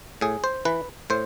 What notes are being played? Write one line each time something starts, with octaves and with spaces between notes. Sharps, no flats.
A2 G#4
C5
E3 B4
A2 C5